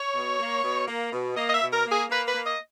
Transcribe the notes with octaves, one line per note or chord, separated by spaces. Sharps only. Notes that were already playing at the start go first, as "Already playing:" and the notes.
Already playing: C#5
B2
A#3
B2
A#3
B2
A#3 D#5
D#5
E5
B2
A#4
A#3
G#4
A#3 B4
B4
A#3
D#5